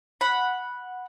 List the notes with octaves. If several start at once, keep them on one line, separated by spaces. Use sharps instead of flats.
F#5 B5